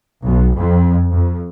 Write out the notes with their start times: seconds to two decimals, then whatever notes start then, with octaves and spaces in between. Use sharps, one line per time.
0.22 B1
0.55 F2
1.12 F2